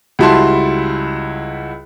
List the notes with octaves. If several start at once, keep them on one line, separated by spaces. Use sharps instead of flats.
C#2 G3 E4 F#4 A5 C6